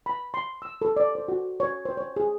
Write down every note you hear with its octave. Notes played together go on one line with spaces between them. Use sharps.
B5
C6
E6
A4
D5
C5
F#4
C#5
C5
C#5
G#4